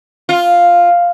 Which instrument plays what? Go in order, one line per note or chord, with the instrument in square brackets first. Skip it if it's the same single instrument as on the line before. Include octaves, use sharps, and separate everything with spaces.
[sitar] F4